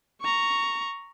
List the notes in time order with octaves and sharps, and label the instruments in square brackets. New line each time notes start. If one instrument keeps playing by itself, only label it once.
[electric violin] A#5 C#6